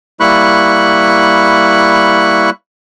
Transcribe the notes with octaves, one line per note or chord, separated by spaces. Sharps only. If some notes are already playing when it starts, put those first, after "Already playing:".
G3 A#3 E4 B5 C#6 F#6